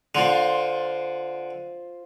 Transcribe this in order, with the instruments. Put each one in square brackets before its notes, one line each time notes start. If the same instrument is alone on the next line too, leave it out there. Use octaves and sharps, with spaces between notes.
[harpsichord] D3 [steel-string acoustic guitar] F4 C5